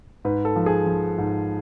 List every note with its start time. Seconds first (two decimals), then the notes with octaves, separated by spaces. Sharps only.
0.25 G#2 B4
0.45 A4
0.56 F3
0.66 G#4
0.86 F3
1.18 G#2